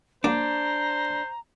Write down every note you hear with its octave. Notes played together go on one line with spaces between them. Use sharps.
F#3 A#3 D4 C5 A#5 D6